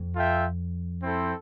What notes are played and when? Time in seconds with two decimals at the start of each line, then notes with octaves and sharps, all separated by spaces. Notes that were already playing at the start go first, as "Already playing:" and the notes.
Already playing: F2
0.15 F4 A4 E5 G5
1.03 C4 E4 A4 C5